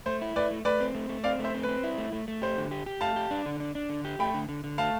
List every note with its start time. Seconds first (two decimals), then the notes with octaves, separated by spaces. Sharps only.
0.06 A3 C5
0.21 E4
0.36 A3 B4 D5
0.51 A3
0.65 A3 B4 D5
0.80 C4
0.95 A3
1.09 A3
1.24 C4 D5 F5
1.39 A3
1.44 C5 E5
1.54 C4
1.63 B4
1.68 C4
1.83 E4
1.98 A3
2.12 A3
2.28 A3
2.42 G4 C5
2.57 D3
2.71 G4
2.86 G4
3.01 A3 F5 A5
3.16 G4
3.31 D4
3.46 D3
3.60 D4
3.75 D4
3.90 D3
4.05 G4
4.19 A3 G5 B5
4.34 D3
4.49 D3
4.64 D3
4.78 A3 F5 A5